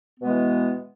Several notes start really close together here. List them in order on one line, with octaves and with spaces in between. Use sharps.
B3 B2 G#3 E3